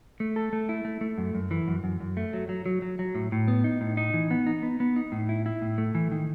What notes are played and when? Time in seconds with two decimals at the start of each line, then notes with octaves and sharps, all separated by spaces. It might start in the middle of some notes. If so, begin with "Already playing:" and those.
0.20 A3
0.36 A4
0.53 A3
0.69 E4
0.85 A3
1.01 A3
1.18 F#2
1.35 F#2
1.51 E3
1.68 F#2
1.84 F#2
2.00 F#2
2.17 A3
2.33 F#3
2.49 F#3
2.66 F#3
2.82 F#3
2.99 F#3
3.15 A2
3.32 A2
3.48 B3
3.64 D#4
3.81 A2
3.97 D#4
4.14 E3
4.31 B3
4.46 D#4
4.63 B3
4.80 B3
4.96 D#4
5.12 A2
5.29 E4
5.46 E4
5.62 A2
5.78 A3
5.95 E3
6.11 D#3